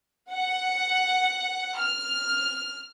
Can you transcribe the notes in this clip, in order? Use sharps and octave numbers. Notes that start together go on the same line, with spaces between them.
F#5
F6